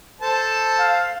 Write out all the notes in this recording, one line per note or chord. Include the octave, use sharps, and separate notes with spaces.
A4 C5 A5
F5